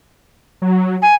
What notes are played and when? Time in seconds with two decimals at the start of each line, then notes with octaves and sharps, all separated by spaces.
0.62 F#3
1.02 G#5